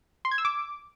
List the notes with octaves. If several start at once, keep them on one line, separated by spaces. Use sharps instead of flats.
C6
G#6
E6
D6